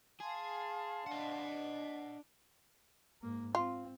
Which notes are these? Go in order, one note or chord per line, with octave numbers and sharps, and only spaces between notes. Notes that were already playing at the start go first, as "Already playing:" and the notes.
G#4 F5 A5 C6
D4 D#5 F#5
G#2 A#3
C4 F4